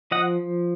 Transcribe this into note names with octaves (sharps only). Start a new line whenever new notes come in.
F3 D#5 F#5